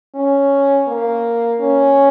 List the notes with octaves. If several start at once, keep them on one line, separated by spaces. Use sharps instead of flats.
C#4
A#3
C#4